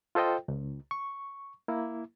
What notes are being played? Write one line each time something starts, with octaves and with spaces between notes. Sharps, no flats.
F4 A4 C5 D#5 G5
C#2
C#6
A#3 E4